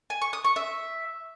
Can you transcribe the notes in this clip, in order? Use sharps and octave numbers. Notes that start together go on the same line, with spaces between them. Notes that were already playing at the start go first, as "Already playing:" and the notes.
G#5
C#6
D#6
C#6
E5